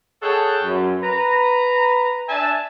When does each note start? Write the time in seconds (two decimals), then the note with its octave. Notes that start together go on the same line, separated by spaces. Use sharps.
0.23 G#4 A4 C#5 F#5 G5 A5
0.64 F#2
1.03 B4 A#5
2.29 D4 E5 G#5 A5